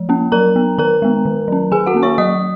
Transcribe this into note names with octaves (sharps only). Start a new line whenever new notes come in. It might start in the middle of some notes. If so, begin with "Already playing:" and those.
Already playing: F3
A#3 C#4
F#3 A#4 A#5
B3
D#3 A#4 A#5
G#3 B3
D#3
F#3 C#4
D#3 G#4 G#5
F#4 F#5
A#3 C#4
C#5 C#6
F#3 D#5 D#6